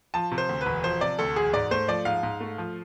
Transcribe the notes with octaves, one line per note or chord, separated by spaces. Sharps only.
F3 A5
C3
C5
D2
B4
E1
F3 C5
C3 D5
D2 A4
E1 G#4
G#2 D5
A3 C5
F3 D5
G#2 F5
G#2
A3
F3